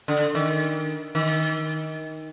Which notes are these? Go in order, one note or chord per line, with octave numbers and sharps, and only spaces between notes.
D3
D#3
D#3